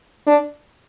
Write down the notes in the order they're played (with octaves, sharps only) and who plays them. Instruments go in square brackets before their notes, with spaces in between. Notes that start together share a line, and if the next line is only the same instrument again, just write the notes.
[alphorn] D4